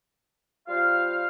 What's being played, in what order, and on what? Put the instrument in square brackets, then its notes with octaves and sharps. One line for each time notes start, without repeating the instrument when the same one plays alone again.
[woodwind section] G3 F4 C5 F5